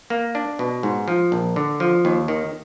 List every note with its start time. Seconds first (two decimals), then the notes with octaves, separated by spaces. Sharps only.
0.10 A#3
0.35 D4
0.59 B2
0.83 G#2
1.08 F3
1.32 A#1
1.56 D3
1.80 F3
2.05 D#2
2.28 D#3